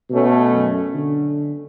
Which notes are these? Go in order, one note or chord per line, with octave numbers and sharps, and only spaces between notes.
B2 A3 C#4
F#2
D3